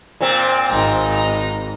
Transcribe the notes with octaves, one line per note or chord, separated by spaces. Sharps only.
A#2 C4
G#1 D#4 A#5